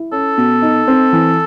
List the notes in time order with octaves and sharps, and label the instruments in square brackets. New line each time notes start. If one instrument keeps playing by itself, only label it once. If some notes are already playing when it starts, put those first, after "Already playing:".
Already playing: [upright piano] E4
[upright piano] C#4 [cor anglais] A4
[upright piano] B2
D#4
C4
E3